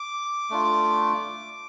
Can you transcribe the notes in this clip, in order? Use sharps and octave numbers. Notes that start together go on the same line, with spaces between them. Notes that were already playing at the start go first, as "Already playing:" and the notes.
Already playing: D6
A3 D4 F4